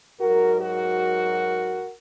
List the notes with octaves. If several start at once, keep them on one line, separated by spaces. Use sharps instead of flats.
G#2 F#3 F#4 A#4
F#4 A#4